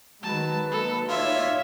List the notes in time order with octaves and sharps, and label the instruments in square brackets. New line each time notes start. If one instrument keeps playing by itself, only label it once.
[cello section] D#3 G#3 [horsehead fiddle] F#3 B4 [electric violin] A5
[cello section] A#3 D#4 [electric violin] A4
[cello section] D#4 C#5 [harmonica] F4 [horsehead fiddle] D5 [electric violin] E5